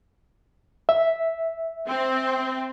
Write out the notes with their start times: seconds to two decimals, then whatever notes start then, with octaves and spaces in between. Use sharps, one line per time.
0.89 E5
1.87 C4